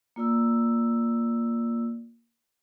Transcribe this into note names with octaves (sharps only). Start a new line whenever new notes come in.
A#3 F4 D5 E6